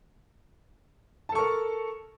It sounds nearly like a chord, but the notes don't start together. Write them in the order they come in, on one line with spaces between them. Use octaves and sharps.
A5 A4 C#6 A#4